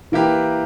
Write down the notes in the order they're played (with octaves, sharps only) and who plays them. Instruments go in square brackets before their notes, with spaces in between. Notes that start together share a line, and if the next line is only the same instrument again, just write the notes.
[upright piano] E3 [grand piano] A#3 E4 G4 B4